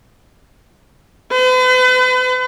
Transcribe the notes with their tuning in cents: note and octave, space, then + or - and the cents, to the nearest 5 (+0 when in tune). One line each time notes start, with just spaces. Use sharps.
B4 +45